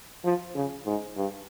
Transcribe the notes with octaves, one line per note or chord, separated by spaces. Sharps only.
F3
C#3
G#2
G2